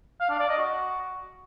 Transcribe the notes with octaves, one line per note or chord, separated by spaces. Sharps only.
F5
D4
D5
D#5
F#4